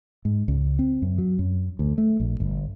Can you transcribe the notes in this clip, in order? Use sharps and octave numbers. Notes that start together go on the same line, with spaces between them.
G#2
C#2
C4
F#2
F#3
F#2
D2
A3
A#1
G1